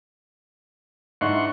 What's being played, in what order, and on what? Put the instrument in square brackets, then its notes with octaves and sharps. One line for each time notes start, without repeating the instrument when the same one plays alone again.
[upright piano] G#2 D4 E4 [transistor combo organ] F#5 C6 C#6